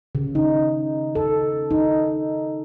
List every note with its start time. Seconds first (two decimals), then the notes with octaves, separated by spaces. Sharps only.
0.15 C#3
0.35 D#4
1.15 A4
1.71 D#4